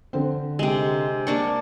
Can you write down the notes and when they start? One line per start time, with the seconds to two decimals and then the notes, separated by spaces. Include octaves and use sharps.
0.13 D3 C4
0.59 C3 G#3
1.27 A#3 D4 C#6